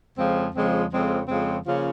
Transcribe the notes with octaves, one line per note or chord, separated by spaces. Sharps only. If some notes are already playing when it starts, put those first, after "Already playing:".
F2 C#3 F3 G#3 C4
F2 C#3 F3 G#3 C4
F2 C#3 F3 G#3 C4
F2 C#3 F3 G#3 C4
C#3 F3 A#3 C#4 F4